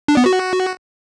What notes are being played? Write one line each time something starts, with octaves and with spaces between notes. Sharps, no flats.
D4
B3
F#4